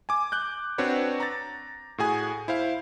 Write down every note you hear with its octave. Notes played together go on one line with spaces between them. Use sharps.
G#5 D6
D6 F#6 G6
C4 D4 F#4 B4 C#5
A#5 A6
A2 F#4 G#4 G#5
E4 C5 F5